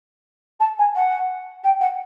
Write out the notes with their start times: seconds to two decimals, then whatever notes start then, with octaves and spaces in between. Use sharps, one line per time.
0.60 A5
0.78 G#5
0.95 F#5
1.63 G5
1.80 F#5